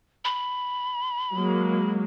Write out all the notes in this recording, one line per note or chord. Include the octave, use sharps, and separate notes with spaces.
B5
F#3 G#3 A#3